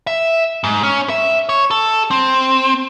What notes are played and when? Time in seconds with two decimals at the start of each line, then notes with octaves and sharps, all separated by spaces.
0.07 E5
0.64 G#2
0.83 C#4
1.09 E5
1.49 C#5
1.71 A4
2.11 C4